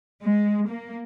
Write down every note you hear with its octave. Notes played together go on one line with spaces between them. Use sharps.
G#3
A#3